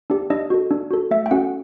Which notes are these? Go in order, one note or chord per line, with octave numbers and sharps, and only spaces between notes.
D4 G4
D4 D#5
F#4 A4
D4
F#4 A4
A3 E5
G5
C#4 F#4 A4 F#5